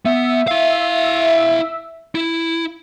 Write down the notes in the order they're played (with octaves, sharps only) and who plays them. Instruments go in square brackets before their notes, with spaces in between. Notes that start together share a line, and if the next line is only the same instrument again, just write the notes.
[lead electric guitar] B3 [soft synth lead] E5
[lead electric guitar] E4 F5
E4